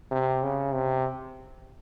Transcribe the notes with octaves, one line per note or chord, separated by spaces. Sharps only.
C3
C#3
C3